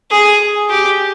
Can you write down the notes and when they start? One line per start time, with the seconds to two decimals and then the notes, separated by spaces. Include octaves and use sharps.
0.11 G#4
0.70 G4